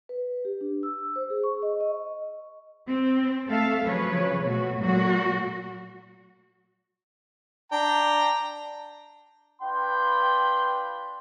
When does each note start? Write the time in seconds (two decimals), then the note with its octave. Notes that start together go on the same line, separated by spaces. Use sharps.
0.09 B4
0.45 G4
0.61 D4
0.83 E6
1.16 C5
1.30 G#4
1.43 C#6
1.63 D#5
1.81 D#5
2.88 C4
3.48 A3 A4 E5 F5
3.85 C#3 F3 F#3 B4 C#5
4.42 B2 A3 F#4
4.80 A#2 F#3 A3 F#4
7.72 D4 G5 A#5
9.62 D4 F4 B4 G5 B5 C6